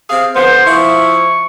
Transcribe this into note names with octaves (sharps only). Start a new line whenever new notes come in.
C3 G#4 F5
D3 F3 B3 C5
F3 E4 C#6